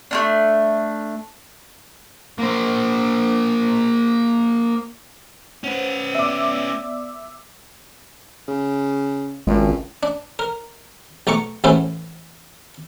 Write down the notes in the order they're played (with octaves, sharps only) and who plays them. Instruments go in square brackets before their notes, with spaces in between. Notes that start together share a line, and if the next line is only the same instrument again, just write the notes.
[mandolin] A3 C#4 D4
[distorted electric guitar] A#3 C5
[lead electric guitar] C#4 B4 [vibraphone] C5 F#5
[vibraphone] B3 D5 [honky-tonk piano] E5 D6
[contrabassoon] C#3
[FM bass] G#1 [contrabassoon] C#2 [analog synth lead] G#3
[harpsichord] D4
A#4
B1 A3 A#5 C#6 D6
A1 A3 B3 C#4 E4 C5